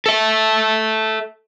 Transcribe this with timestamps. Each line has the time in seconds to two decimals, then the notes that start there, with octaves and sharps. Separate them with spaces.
0.06 A4 E5